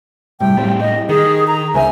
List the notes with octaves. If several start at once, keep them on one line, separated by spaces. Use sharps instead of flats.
A2 C3 G3 G5
A2 G3 C4
G4 D#5
D#3 G#4
A#5
C#2 A#4 C5 E5 G#5